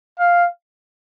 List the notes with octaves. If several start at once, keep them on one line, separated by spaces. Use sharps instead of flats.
F5